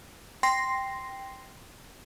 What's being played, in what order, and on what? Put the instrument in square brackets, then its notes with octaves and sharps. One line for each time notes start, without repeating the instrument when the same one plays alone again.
[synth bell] G5 C6 A#6 C7